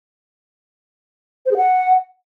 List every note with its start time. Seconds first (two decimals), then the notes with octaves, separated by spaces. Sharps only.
1.46 C5
1.51 G#4
1.57 F#5